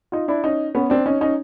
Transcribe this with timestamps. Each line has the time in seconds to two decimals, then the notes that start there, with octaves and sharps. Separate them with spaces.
0.12 D#4 F4
0.28 D4 E4
0.44 C#4 D#4
0.75 B3 C#4
0.90 C4 D4
1.06 C#4 D#4
1.21 C#4 D#4